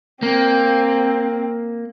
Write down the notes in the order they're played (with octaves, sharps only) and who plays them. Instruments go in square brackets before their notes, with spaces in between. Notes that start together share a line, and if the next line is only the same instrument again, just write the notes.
[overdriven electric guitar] A#3 [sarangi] C4